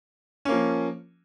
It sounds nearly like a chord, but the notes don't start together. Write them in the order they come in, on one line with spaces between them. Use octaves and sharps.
C#4 A#3 F3